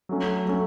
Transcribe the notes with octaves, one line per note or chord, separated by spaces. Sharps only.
F#3 A3 C#4
F#3 A3 C#4